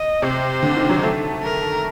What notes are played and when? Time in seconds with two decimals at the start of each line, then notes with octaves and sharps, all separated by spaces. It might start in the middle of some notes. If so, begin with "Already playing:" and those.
Already playing: D#5
0.22 C3 C5
0.63 D3
0.77 D#3
0.89 F#3
1.03 A3
1.43 A#4